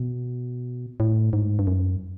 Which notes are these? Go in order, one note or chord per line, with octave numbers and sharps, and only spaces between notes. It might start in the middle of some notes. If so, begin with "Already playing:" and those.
Already playing: B2
A2
G#2
G2
F#2